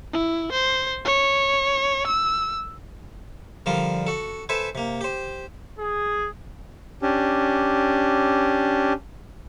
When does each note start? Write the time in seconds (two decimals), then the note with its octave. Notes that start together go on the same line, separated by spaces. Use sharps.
0.13 E4
0.52 C5
1.05 C#5
2.07 E6
3.66 D3 F3 G3 F4 A#4
4.07 F#4 A4
4.49 A4 B4 C5 E5 G#5
4.75 C3 A#3
5.01 G4 C5
5.79 G#4
7.02 C#4 D4 G4